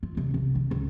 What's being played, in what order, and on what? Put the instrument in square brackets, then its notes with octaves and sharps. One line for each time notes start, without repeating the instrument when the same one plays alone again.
[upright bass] F4
C2
C2
D#3
C#2